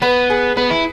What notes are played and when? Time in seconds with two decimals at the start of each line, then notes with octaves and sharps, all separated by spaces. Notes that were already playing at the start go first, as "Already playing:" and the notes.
0.02 B3 B4
0.30 G#4
0.57 B3 B4
0.71 E4